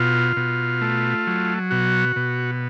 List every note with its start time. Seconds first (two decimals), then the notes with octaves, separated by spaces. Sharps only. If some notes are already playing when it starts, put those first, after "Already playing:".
Already playing: B2 F4
0.37 B2
0.81 A3
1.27 F#3
1.71 B2 F#4
2.16 B2